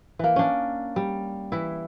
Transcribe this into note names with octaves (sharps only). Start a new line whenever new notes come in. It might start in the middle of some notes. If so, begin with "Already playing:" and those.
E3 A#3
C#4 D4
G3
E3 E4